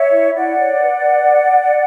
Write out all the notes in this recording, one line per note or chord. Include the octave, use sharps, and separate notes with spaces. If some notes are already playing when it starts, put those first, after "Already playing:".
Already playing: C#5 E5
E4
E4 D5 F#5
C#5
B4
B4